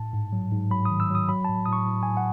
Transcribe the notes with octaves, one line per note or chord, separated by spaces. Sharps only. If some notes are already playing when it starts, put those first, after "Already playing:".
Already playing: A2 A5
G#2
F#3
G#2
F#3 B5
D#3 D#6
E6
F#3 D#6
F#3 B5
A2 A5
D#6
A2 C#6
A2
A2 G#5
F#5